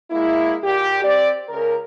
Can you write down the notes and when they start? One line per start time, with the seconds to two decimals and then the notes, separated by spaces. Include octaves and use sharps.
0.11 G#3 A#3 E4
0.63 A#2 G4
1.02 C4 D5
1.49 C#2 A#4